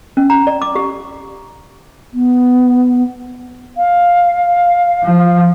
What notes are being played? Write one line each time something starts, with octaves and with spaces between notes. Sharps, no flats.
C#4
A#5
D5
D6
G4
B3
F5
F3